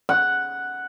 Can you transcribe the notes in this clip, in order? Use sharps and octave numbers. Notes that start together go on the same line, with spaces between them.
F#5